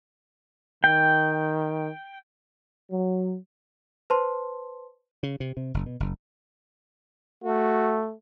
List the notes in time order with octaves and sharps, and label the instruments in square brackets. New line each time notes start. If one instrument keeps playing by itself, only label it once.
[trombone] D#3 [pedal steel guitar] G5
[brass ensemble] F#3
[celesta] B4 C5 A5 C6
[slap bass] C#3
C3
C3
F#1
B2
F#1
[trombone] A3 [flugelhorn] F#4